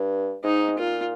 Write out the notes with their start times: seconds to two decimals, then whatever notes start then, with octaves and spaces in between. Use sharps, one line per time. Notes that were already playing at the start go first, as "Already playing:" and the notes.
Already playing: G2
0.44 G#2 D#4
0.78 A#2 F4